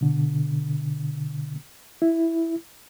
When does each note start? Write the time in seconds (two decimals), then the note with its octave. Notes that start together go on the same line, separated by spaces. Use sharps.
0.01 B2 D3
2.02 E4